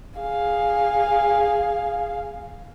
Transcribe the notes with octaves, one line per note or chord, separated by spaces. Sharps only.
G#4 F5